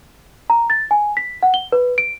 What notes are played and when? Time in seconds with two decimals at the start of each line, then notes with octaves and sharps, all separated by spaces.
0.50 A#5
0.70 A6
0.91 G#5
1.17 B6
1.43 F#5
1.54 G7
1.72 B4
1.98 D7